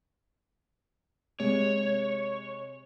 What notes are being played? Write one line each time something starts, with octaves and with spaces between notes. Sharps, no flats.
C3 G#3 C#5